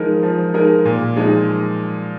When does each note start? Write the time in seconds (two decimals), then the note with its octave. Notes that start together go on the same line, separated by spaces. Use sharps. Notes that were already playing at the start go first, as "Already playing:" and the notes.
Already playing: F3 G#3 D#4 A#4
0.23 F3
0.54 G#3 D#4 A#4
0.85 A#2
1.16 F3 G#3 D#4